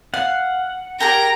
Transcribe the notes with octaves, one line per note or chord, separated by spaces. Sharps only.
F5 F#5
G4 G#4 A#4 G5 A#5